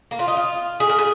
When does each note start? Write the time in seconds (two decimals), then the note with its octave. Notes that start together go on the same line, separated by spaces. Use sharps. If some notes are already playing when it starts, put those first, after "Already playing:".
0.11 A#3
0.19 F4
0.28 D#4
0.37 F4
0.80 G#4
0.89 A#4
0.98 G#4